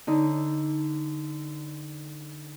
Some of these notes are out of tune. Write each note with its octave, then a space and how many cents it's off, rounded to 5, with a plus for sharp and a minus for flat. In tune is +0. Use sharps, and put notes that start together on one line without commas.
D3 +0 D#4 +5